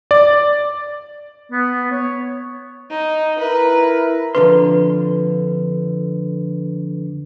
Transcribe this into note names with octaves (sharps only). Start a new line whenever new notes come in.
D5
B3
C#5
D#4
E4 A#4 B4
F2 D3 B4 C6